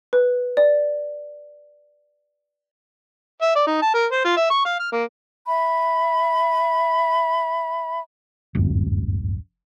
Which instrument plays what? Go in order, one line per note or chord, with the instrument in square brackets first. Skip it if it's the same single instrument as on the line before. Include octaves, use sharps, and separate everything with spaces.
[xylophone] B4
D5
[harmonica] E5
D5
D#4
A5
A#4
C5
F4
E5
C#6
F5
F6
A#3
[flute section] E5 B5
[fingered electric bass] D1 G1 F#2